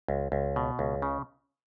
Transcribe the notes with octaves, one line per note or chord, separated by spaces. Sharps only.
C#2
C#2
B2
C#2
C#3